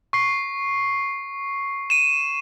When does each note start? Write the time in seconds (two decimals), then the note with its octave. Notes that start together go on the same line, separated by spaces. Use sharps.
0.13 C#6 C7
1.90 D#7 E7